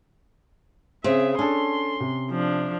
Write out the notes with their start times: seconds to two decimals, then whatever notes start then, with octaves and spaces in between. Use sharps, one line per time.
1.04 C#3 C4 G#4 E5
1.39 C#4 D4 A4 C6
2.00 C3
2.31 F3 D4